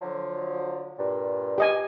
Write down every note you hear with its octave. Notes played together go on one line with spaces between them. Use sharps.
D3 F3 F#3
G2 A#2
G4 D#5 G#5